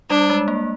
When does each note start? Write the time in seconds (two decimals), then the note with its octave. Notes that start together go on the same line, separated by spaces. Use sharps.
0.10 G3 D4
0.30 G#3
0.48 A#3